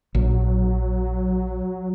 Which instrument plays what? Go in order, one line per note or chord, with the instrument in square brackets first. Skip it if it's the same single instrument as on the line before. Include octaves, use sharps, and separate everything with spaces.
[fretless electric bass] A#1 [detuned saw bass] F#3